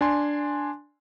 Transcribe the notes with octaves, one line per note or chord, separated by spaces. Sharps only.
D4 G#5 C6